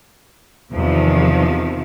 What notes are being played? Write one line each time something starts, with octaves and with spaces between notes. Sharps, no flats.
E2 C3 D#3 F3